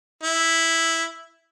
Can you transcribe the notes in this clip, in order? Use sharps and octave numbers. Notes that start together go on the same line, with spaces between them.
E4